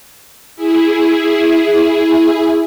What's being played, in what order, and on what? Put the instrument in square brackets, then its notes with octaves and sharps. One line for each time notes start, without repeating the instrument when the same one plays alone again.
[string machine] E4 G#4